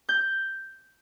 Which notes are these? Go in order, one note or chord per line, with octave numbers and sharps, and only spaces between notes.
G6